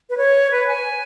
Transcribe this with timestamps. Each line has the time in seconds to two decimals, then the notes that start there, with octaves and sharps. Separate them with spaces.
0.10 B4
0.17 C#5
0.51 B4
0.67 G#5